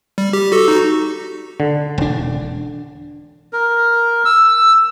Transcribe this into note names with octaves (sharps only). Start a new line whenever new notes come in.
G3
G4
F#4 A4
D#4 F#4
D3
E1 D4
A#4
E6